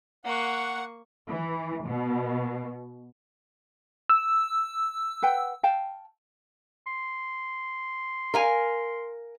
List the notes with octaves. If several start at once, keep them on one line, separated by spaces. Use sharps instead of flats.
A#3 F#5 C#6
E3
B2
E6
B4 F#5 G5
F5 G5 A5
C6
A#4 F5 G#5